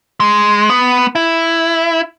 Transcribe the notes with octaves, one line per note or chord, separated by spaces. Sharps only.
G#3
B3
E4